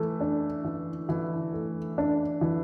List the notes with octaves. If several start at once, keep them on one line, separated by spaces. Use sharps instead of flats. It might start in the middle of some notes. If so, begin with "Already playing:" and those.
Already playing: E3 A3
D4
E3
E3
A3
D4
E3